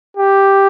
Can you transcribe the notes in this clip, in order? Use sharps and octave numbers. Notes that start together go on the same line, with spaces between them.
G4